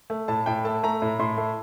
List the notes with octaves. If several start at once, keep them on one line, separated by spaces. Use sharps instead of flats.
A3
A2 A5
A2 G5
A3 A5
A3 A#5
A2
A2 C6
A3